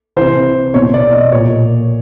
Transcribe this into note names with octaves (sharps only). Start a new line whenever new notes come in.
C3 E3 C5
B2 C#5
D5
D#5
A#2 C#5